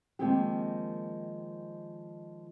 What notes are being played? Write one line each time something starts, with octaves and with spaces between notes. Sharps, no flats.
D#3 F3 G#3 A#3 C4 G4